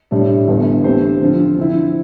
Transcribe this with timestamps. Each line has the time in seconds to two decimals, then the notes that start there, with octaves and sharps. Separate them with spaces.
0.11 A2 G3 D4
0.48 G1 G2 E3
0.84 D3 A3 C4 G4 C5
1.21 D3 F3 C4 F4
1.57 D3 F3 C4 E4